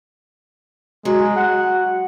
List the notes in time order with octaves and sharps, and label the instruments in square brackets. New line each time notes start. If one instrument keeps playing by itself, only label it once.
[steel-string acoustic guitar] F#3 [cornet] G#3
[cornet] F#5